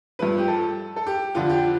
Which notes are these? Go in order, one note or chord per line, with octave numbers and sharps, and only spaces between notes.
G2 F3 B4
G4
A4
A4
G4
F2 D3 F3 F4
G4